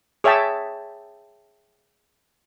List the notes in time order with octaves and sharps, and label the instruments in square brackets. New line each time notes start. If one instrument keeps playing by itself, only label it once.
[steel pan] G#4 C#5 E5 G5 A5